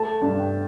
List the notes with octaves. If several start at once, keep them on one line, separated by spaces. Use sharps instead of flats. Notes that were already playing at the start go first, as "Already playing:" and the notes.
Already playing: A3 A5
G2
G5